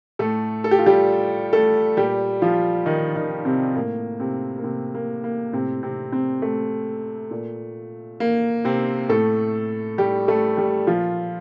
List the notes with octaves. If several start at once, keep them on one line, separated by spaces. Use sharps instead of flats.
A2 A3 A4
A4
G4
F4
G3 G4
A3 A4
A#2 G3 G4
F3 F4
D#3 D#4
D#3 D#4
C3 C4
A2 A#3
C3 C4
A#3
C3 C4
A#3
A#3
A2 C3 C4
C3 C4
C3 C4
A3
A#2
A#3
C3 C4
A2 A3 A4
G3 G4
A3 A4
G3 G4
A#2 F3 F4